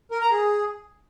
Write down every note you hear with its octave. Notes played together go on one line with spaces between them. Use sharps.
A#4
A#5
G#4